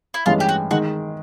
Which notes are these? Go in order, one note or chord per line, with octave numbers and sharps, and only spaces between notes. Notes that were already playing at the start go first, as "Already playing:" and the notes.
E4
A1 G2 E3 G#3 C#4 F4
G4
F#4
D#3 G#3 F#4